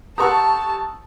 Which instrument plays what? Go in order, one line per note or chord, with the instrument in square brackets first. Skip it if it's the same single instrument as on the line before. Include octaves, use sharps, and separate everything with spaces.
[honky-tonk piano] G4 A4 C#6 [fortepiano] F#5 A#5 [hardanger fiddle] A5 [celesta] D#6 E6